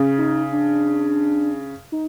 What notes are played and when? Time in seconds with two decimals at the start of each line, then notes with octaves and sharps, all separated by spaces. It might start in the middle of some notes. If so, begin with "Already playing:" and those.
Already playing: C#3
0.18 D#4
0.53 D4
1.92 D#4